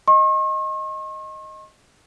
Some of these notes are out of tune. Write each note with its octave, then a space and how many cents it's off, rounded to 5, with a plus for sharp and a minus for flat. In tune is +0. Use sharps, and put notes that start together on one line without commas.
D#5 +0 C#6 -45